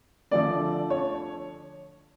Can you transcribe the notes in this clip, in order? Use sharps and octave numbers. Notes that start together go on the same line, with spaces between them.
D3 F3 A3 D5
C#5